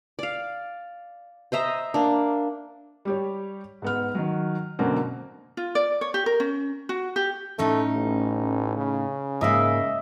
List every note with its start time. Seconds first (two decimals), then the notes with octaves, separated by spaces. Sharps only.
0.19 D5 F5
1.52 C5 D#5 E5 A#5
1.94 A#3 D4
3.05 G3 G4 C#5
3.82 G#2 B3 F6
4.15 D#3 F#3
4.79 F#2 B2 D3 A#3 C4
5.57 F4
5.75 D5
6.01 C#5
6.14 G4
6.26 A#4
6.40 C#4
6.89 F#4
7.16 G4
7.59 A2 A3 C#4 D#4
7.95 A1
8.77 C#3
9.41 G#2 A#3 D#5 E5